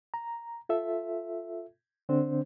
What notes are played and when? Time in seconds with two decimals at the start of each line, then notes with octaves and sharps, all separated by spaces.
0.14 A#5
0.69 F4 A4 E5
2.09 D3 C4 D4 C5